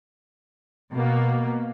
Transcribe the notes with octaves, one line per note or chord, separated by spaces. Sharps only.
B2 A#3